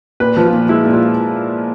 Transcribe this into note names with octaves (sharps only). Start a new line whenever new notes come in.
A#2 B4
F3
F4
A#2
G#3 E4
A#2
F4